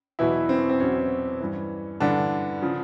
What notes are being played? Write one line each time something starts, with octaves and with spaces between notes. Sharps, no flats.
E2 B2 E3 F#3 E4
C4
C4
E2 B2 F#3 C#4
G2 E3
G2 D3 E3 D4
C#3 F3